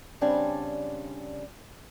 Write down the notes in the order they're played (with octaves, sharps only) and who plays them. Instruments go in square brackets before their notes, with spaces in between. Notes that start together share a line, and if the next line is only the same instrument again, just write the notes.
[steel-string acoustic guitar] C#3 G3 C4 D4 D5 G#5